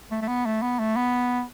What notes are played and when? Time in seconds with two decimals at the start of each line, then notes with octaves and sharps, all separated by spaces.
0.11 A3
0.21 A3
0.28 B3
0.46 A3
0.62 B3
0.79 A3
0.96 B3